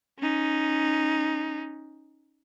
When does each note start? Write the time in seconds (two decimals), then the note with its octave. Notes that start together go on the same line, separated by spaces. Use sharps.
0.19 C#4 D#4